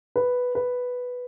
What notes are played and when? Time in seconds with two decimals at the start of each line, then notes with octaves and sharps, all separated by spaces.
0.16 B4
0.55 B4